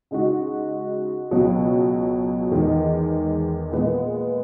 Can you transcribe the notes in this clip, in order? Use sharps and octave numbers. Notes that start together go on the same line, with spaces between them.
C#3 G#3 D#4 F#4
C#2 B2 F#3
E2 D#3 G#3
A#2 G#3 B3